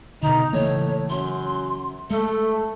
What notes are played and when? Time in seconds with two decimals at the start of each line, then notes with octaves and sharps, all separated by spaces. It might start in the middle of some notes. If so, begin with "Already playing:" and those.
0.23 B2 D3 D#4 A#5
0.53 A2 C#3 E3 A#3 C#5
1.10 F#2 C6
2.11 G#3 A3 A4